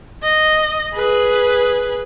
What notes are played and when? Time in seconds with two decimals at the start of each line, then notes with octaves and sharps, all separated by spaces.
0.23 D#5
0.94 G#4 B4